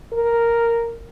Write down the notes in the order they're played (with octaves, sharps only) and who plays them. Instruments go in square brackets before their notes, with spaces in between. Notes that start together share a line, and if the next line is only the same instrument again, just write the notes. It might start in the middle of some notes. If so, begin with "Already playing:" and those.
[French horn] A#4